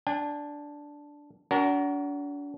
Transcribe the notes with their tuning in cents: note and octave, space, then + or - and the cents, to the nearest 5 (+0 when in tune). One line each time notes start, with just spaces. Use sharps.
D4 -5 G#5 -45
D4 -40 F#4 +20 A#4 +0